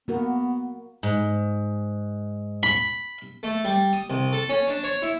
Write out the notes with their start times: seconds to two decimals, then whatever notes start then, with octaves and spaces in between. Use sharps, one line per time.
0.08 A#3 B3 F#4 A#4
1.03 G#2
2.63 B5
3.43 A3
3.65 G3
3.93 D#6
4.10 C2
4.33 A4
4.49 C#4
4.68 D4
4.84 C#5
5.02 E4